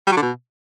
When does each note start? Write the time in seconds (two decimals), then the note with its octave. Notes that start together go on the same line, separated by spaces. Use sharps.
0.07 G3
0.12 F#3
0.17 D3
0.22 B2